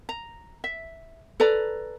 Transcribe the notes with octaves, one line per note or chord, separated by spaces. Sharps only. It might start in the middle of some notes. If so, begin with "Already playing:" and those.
A#5
E5
A4 B4 D5 A#5